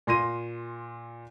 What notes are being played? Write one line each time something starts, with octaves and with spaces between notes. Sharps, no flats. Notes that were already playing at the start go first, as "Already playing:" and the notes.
A#2 C6 A#6 D#7